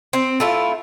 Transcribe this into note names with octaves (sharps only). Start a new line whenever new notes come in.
C4
A3 E4 F4